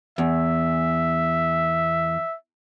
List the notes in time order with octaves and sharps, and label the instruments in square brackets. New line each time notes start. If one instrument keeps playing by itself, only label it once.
[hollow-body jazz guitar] E2 [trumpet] E5